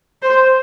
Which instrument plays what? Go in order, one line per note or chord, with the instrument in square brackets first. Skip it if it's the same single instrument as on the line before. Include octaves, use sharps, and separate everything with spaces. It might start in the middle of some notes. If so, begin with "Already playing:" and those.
[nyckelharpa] C5